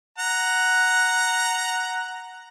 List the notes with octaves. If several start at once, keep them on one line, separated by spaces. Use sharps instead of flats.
F#5 A#5